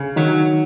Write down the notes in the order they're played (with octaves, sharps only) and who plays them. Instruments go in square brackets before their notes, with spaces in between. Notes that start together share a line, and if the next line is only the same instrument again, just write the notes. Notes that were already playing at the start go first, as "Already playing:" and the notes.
Already playing: [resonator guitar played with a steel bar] C#3
[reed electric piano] D#3 D#4 [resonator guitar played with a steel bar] F#3